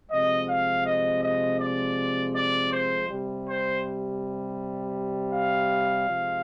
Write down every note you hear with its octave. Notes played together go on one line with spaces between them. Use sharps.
C3 F3 G#3 D#5
F5
D#5
D#5
D5
D5
C5
C3 G3
C5
F5
C3 F3 G#3